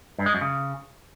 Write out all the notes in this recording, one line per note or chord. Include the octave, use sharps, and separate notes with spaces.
G2
G#3
F#2
C#3